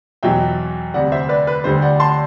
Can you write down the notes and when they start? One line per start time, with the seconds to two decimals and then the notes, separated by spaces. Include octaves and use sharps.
0.23 E2 B2 F#3 E5 G5
0.94 D2 C3 G3 D5 F#5
1.12 C5 E5
1.29 B4 D5
1.47 B4
1.64 D2 D3 G3 C5
1.82 D5 F#5
2.00 A5 C6